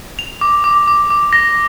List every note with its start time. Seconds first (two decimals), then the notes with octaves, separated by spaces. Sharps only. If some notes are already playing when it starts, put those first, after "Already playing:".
0.19 F7
0.41 D6
0.64 D6
0.87 D6
1.10 D6
1.33 A#6